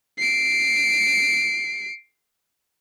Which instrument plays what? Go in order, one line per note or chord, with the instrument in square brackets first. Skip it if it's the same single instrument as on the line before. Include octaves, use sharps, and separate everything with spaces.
[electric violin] C7 D7